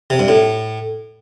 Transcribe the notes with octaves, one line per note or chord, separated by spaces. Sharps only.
C3
G2
A2